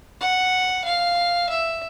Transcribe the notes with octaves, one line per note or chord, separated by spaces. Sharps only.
F#5
F5
E5